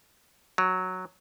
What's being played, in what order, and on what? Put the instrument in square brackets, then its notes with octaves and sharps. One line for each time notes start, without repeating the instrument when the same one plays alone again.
[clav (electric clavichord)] F#3